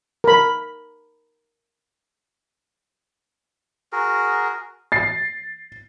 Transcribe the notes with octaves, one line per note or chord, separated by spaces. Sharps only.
A#4 B5
F#4 G#4 A#4
A6 C7